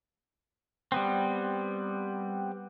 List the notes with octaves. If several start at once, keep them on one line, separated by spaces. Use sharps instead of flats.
G3 B3 C4